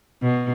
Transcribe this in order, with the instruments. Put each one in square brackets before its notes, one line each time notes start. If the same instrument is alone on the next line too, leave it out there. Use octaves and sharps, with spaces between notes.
[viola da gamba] B2